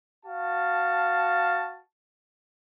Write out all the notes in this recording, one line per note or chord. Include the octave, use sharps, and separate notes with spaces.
F#4 F5 A5